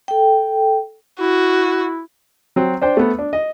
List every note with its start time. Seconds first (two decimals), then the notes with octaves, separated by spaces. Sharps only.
0.08 A4 G5
1.20 E4 F#4
2.56 F#3 C4
2.82 D4 C5 G5
2.97 A3 B3
3.19 D4
3.33 D#5